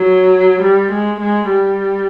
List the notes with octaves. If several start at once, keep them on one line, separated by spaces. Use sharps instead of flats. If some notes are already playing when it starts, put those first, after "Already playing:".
Already playing: F#3
G3
G#3
G#3
G3